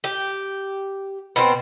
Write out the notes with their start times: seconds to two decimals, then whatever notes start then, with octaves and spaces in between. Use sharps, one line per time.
0.04 G4
1.36 B2 C4